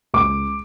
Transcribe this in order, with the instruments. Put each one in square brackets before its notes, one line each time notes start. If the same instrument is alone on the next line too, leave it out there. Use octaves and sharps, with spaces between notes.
[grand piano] C#2 D6